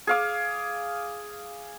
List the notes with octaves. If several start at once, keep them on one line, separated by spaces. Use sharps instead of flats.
G#4 F5 D6